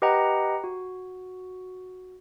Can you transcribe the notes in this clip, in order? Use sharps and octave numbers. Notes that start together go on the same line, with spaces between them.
G4 B4 D#5 F#5 G5 A#5
F#4